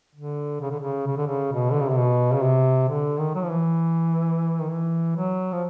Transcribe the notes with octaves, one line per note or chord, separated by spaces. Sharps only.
D3
C#3
D3
C#3
C#3
D3
C#3
B2
D3
C#3
C3
B2
C#3
C3
D3
D#3
F#3
F3
E3
D#3
E3
F#3
F3